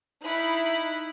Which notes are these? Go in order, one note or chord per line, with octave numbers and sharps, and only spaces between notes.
D#4 E4 B5 F#6